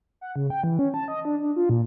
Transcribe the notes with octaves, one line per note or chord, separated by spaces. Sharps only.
F#5
C#3
G5
E3
C#4
A5
D#5
D4
D4
F4
A#2